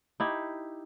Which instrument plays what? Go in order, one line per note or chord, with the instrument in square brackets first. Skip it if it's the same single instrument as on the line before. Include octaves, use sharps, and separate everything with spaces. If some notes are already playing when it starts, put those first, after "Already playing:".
[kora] D#4 E4 G4